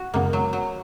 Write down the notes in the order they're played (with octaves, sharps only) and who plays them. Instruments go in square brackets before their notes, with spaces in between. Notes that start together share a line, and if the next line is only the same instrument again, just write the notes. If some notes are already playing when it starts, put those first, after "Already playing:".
Already playing: [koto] F#4
[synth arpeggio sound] G#1 F#2 C#3 G#3 B3 [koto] A#3
[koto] F#3
F#3